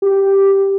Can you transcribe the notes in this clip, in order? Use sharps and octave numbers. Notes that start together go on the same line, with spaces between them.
G4